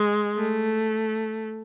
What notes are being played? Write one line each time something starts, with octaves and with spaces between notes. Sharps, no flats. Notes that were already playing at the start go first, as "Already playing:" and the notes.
Already playing: G#3
A3